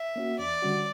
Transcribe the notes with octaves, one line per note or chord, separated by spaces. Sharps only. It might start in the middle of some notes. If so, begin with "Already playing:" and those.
Already playing: E5
A#3 C#4 F#4
E2 D5
D3 G3 C#4 F#4